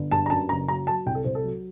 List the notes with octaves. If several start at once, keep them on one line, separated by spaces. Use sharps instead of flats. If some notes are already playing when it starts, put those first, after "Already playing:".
Already playing: G1
G2 A5
A#5
F#2 A5
F#1 A#5
F#3 A#5
F#3 A5
C2 G5
A4
C2 C5
A4
F#3